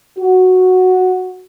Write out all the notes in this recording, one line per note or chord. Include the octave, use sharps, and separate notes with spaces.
F#4